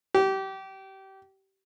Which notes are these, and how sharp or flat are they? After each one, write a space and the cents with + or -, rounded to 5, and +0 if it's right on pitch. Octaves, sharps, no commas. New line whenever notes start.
G4 -25